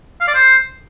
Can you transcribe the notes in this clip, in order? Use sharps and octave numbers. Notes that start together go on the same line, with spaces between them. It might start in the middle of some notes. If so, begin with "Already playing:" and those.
F5
D5
C5